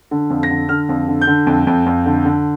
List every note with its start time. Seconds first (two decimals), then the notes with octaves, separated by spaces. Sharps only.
0.11 D3
0.30 F2
0.43 A#6
0.50 D3
0.69 D3 F6
0.89 F2
1.08 D3
1.21 G6
1.27 D3
1.47 F2
1.67 F2
1.86 F2
2.06 D3
2.25 D3